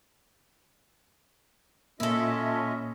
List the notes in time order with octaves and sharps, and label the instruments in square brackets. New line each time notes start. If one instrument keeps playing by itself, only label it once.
[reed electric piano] A#2 A#3 [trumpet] C#4 [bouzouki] E4 A4 [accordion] F4 D#5 E5